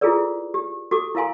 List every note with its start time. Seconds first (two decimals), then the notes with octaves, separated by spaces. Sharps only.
0.01 E4 F4 G#4 A4 B4 D5
0.54 G4
0.91 F#4 G4 A4 D6
1.15 E4 A#4 F5 G#5 C6